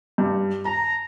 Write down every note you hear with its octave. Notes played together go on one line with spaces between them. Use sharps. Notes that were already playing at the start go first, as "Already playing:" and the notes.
G2
A5 A#5